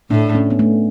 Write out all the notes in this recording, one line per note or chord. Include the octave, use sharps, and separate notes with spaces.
A2 D4
C#4
B3
A3